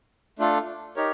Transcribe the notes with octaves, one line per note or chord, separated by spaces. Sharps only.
A3 D4 F4 A4
D#4 G4 A#4 C#5